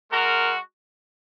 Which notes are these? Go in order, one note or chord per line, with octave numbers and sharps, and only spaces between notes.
G#3 F#4 A#4